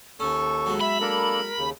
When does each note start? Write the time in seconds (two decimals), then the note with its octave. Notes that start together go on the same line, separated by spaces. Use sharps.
0.20 D#2 C#4 A4 C#6
0.66 F#3 G#3 B3
0.81 E5 B5
1.01 A#3 D4 A4 A#4
1.57 D#2 C#3